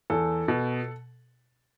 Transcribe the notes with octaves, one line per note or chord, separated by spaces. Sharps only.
E2 A4
B2